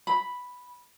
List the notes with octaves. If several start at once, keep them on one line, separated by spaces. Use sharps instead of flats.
B5